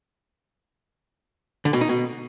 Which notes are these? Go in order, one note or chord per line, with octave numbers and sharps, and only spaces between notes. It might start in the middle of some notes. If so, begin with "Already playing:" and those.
D3
B2
D#4
B2